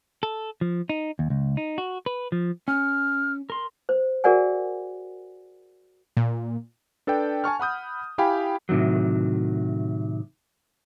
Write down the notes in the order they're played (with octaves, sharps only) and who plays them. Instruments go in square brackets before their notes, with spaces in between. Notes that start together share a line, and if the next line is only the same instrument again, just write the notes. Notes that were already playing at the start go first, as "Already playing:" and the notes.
[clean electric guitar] A4
F3
D#4
D#2
C#2
D#4
F#4
B4
F3
[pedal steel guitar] C#4 [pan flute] F6
[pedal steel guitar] A#4 C6
[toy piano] C5
F#4 G#4 A#4 D5 F#5 G#5
[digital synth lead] A#2
[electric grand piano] D4 A4 B4 D5 G5
G#5 A5 C#6 F6
F#5 B5 D#6 G6
E4 G4 F5 G5 G#5 B5
[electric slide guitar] A2 C3 D#3 F#3